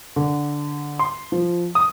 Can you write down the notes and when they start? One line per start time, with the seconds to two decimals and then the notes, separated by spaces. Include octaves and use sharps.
0.16 D3
0.99 C6
1.32 F3
1.75 D#6